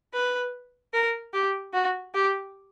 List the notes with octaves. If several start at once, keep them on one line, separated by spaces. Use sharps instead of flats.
B4
A#4
G4
F#4
G4